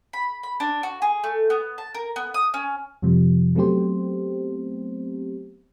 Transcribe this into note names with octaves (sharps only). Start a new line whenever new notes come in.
B5
B5
D4
F#4
G#4
A3
B3
A5
A#4
B3
D#6
C#4
F2 C3 F3 G3
F#3 A3 B3 C4 G4 C5